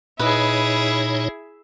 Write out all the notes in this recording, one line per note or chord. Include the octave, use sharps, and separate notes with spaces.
A#2 D#4 E4 G#4 B4 C#5 D#5